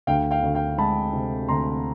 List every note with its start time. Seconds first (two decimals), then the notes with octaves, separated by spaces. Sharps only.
0.07 D2 F5 G5
0.31 F5 G5
0.43 D2
0.54 F5 G5
0.78 G#3 A5 B5
1.13 C3
1.49 D2 A#5 C6